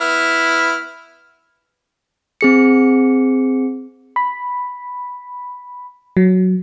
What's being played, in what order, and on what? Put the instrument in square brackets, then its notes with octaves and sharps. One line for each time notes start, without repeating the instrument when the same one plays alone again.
[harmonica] B3 E4 F6
[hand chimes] C4 G#4 C#7
[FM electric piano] B5
F#3